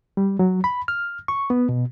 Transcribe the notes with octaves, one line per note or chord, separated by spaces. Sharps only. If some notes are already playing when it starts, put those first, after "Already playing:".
G3
F#3
B5
F6
C#6
B3
B2